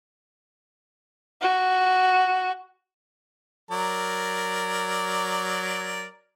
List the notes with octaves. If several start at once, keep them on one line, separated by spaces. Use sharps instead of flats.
F#4
F#3 A#4 D5